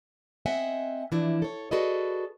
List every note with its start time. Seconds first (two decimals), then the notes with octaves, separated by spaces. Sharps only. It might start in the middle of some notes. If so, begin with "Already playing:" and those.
0.46 C4 D#5 E5 F#5 G#5
1.12 E3 F3 D4 E4
1.42 A4 C#5
1.71 F#4 G#4 A4 B4 D5 D#5